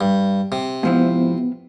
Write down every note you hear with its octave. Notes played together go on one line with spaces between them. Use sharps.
G2
C3
G#2 F3 B3 E4